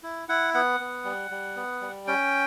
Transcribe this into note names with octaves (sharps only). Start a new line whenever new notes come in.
E4
E4 F#5
B3 F#5
B3
G3
G3
B3
G3
C#4 G5